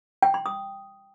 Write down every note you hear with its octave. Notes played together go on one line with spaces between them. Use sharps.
G5
C6
D#6